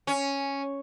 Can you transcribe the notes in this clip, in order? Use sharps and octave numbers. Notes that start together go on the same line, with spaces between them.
C#4